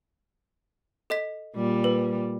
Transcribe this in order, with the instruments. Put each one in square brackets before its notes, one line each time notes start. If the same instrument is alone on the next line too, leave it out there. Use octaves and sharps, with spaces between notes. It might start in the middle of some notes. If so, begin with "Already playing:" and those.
[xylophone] A4 D#5 B6
[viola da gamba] A#2 G3
[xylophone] B4